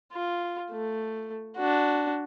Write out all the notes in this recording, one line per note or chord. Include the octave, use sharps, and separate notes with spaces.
F4
A3
D4 F#4